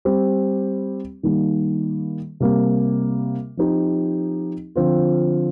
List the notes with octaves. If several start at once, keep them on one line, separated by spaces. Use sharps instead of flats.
G3 C4 G4
D#3 G3 A#3
C3 G3 A#3
F3 C4 D#4 G4
D3 F3 C4 F4